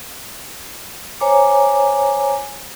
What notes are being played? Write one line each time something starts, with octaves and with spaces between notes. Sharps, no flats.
C5 C#5 G#5 A#5 D6